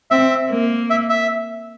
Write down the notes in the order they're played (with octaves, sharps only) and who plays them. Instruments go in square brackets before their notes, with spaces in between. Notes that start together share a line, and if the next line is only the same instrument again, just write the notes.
[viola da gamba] C4 [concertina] E5
[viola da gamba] A#3
[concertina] E5
E5